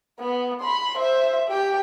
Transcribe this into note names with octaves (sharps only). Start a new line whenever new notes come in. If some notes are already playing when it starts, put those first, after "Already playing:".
B3
B5 C6
C5 E5
G4 G5